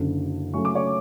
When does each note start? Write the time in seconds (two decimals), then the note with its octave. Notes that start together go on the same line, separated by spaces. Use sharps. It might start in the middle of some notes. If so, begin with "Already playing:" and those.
Already playing: F#1 F#2 D3
0.54 F#2 C#3 F#3 A3 C#4 C#6
0.65 D6
0.75 C#5 C#6